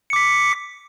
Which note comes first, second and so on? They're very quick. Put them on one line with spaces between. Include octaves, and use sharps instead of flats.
C#7 D6 B6